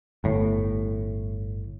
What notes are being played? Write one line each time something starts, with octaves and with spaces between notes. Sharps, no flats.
G1 A2